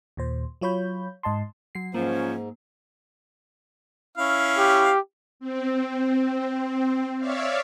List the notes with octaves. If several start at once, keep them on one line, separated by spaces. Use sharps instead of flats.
D#2 A#2 C5
F#3 F4 C#5 B5 G6
G#2 D#5 A5 C6
F#3 C7
G#2 F3 A#3 C#4
C#4 E4 F5
G4
C4
C#5 D5 E5 F5